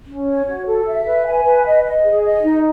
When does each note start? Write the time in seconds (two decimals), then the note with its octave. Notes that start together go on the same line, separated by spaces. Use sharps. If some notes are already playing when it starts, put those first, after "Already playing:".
0.07 C#4
0.27 C#5
0.47 F#4
0.67 A4
0.87 E5
1.06 B4
1.26 G#5
1.44 B4
1.65 D#5
1.84 D#5
2.04 G#4
2.23 D#5
2.43 D#4